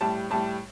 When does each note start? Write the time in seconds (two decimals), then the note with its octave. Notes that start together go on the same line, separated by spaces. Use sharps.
0.01 A2 G3 A5
0.30 A2 G3 A5